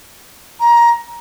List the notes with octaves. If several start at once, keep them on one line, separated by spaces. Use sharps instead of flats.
A#5